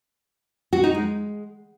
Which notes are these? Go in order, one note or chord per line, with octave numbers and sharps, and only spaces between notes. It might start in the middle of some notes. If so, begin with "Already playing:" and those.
F#4
D#4
G#3